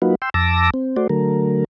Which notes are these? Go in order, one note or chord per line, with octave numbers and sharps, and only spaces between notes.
F#3 A#3 D#4 F4 F#4 B4
G5 C6 E6
F2 A5 D6 E6 A#6
C4
A3 F#4 C5 D5
D3 F#3 A3 A#4